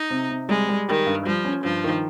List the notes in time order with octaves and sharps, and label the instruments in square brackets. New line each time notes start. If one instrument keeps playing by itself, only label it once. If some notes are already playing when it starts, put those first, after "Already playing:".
Already playing: [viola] D#4
[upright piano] C3
C3
[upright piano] G3 [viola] G#3
[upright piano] G3
[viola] D#3 [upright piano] G4
[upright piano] G2
[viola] F3 [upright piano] G3
[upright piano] C#4
[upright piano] G2 [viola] F3
[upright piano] D#3